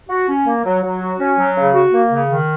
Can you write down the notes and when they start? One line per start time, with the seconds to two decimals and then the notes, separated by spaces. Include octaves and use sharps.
0.09 F#4
0.29 C#4
0.46 A#3
0.64 F#3
0.83 F#3
1.01 F#4
1.20 C#4
1.38 F#3
1.56 C#3
1.74 F#4
1.93 A#3
2.10 C#3
2.29 D#3